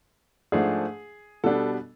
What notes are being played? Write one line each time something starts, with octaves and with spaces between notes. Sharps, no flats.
G#2 F3 A3 D4 G#4
B2 G3 B3 D4 A4